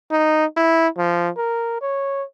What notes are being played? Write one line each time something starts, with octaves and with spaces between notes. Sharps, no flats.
D#4
E4
F3
A#4
C#5